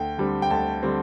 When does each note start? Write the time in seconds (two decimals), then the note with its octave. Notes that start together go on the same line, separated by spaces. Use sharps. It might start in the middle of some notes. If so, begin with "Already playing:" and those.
Already playing: D2 G5
0.18 D3 G3 C4
0.42 G5
0.50 D2 A5
0.83 D3 G3 C4